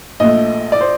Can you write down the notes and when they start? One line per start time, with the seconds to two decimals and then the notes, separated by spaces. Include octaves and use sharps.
0.20 A#1 A#2 A3 D#5
0.72 D5
0.81 C5